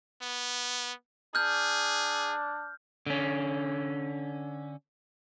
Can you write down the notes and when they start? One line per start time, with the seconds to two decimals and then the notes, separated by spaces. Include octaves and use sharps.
0.22 B3
1.35 D4 G#4 F6 G6
3.07 D3 C#4